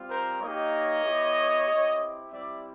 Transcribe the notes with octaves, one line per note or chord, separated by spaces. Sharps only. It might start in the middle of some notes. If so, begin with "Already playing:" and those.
Already playing: G3 C4 F4
A#4 C5
A#3 D#4 G4 C#5 D#5
B3 E4 G4
C4 E4 G4
G3 C4 E4 G4 D5 E5